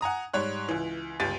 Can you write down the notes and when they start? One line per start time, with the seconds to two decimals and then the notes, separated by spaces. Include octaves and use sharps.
0.01 F#5 G#5 A#5 D#6
0.34 G#2 G3 C#5 F#6
0.69 C#2 E3
1.20 G1 C#2 G4 A6 D#7